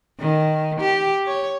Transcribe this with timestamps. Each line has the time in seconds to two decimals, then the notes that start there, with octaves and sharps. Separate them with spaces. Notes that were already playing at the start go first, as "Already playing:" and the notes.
0.20 D#3
0.81 G4
1.27 C#5